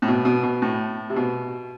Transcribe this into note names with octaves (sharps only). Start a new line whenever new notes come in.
A2
B2
B2
B2
A2
C3
B2